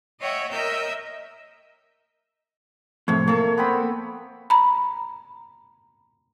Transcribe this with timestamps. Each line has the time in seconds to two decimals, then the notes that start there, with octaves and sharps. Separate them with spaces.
0.22 C#5 D#5 E5 F#5 G5
0.51 A#4 D#5 E5 E6 G6
3.08 F2 A2 C3 C#5
3.28 A#3 A4 C#5
3.58 B3 C4 B5
4.50 A#5 B5